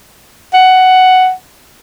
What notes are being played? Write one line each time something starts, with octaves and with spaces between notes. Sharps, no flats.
F#5